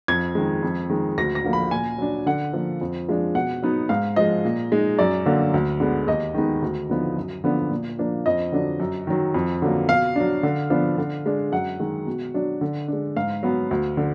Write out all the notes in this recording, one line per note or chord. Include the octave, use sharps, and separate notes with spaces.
F2 G#6
D#3 G#3
F2
D#3 G#3
D2 A#6
A#6
D3 F3 A#3
B5
A#2 G#5
F#3 D4
D3 F#5
F3 A#3
F2
F3 G#3 D4
B2 F#5
F#3 B3 D#4
G#2 F5
F3 G#3 D#5
A#2
G#3 D#4
F#2 D5
D3 F#3 A#3 D4
D2
D3 G#3 B3
D#2 D#5
D#3 G#3 B3 D#4
D2
D3 F3 B3 D#4
F#2
D3 F3 B3 D4
A#2
F3 A#3 D4
F2 D#5
D3 F#3 D4
F#2
D#3 F#3
F2
D3 F#3 A#3
B2 F5
F#3 D4
D3
F3 B3 D4
D3
G#3 D4
F#2 F#5
D#3 G#3
B2
F#3 D4
D3
G#3 D4
G#2 F5
F#3 B3
D2
D3